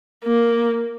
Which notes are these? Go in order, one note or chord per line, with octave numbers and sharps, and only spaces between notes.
A#3